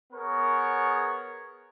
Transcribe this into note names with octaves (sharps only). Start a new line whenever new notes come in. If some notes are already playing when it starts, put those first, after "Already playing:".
B3 G#4 A#4 C#5